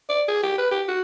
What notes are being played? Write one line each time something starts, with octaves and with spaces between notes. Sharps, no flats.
D5
G#4
G4
B4
G4
F#4